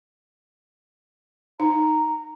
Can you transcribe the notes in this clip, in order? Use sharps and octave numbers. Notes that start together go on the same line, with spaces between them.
D#4 A#5